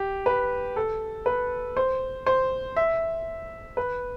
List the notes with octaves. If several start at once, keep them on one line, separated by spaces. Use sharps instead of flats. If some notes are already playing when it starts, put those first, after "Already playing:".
Already playing: G4
B4
A4
B4
C5
C5
E5
B4